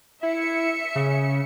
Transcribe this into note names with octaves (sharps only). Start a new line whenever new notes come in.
E4 E5 C#7
C#3